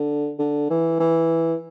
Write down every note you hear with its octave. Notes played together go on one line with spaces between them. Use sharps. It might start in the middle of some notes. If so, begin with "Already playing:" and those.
Already playing: D3
D3
E3
E3